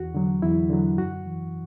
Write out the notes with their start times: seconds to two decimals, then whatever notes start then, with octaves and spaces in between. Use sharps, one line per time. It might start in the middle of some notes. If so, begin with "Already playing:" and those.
Already playing: E2 F#4
0.14 D3 F#3
0.42 E2 E4
0.70 D3 F#3
0.98 F#2 F#4
1.26 E3